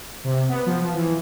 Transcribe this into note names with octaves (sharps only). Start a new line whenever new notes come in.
C3
B3
F3
E3